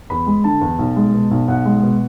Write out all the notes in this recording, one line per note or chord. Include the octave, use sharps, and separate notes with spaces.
E2 B5
G#3
D3 A5
E2
B1
G#3
B2
B1
B1 F#5
G#3
B2